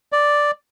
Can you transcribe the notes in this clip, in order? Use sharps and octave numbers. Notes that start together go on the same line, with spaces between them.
D5